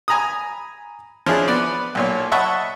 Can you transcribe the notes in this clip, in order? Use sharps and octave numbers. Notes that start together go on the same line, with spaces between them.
G#5 A#5 B5 D#6
F3 C#4 D4 E4 G#4
B3 D5
B1 A#2 C#5
D#5 E5 F#5 A5 B5 C#6